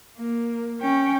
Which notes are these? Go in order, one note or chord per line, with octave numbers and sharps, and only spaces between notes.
A#3
C#4 G5